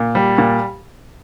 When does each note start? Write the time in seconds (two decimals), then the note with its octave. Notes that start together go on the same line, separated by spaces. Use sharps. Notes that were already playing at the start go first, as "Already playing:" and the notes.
Already playing: A#2
0.15 G3
0.38 A#2